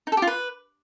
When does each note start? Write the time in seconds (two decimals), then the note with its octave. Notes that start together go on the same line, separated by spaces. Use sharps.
0.07 D#4
0.12 A4
0.17 G4
0.22 F4
0.27 B4